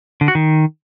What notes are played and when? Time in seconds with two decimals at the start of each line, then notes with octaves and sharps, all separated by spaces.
0.21 D3
0.28 F#4
0.35 D#3